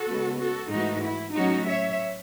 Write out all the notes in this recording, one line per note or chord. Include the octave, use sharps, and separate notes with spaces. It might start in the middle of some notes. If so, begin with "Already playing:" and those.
Already playing: F#4 A4
C#3 G#3 B3
F#4 A4
G#2 E3 A3 D#4 F#4
E4
A2 F#3 C#4 D#4 F#4
C#5 E5